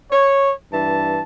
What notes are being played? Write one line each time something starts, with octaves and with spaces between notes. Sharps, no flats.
C#5
G2 E3 A5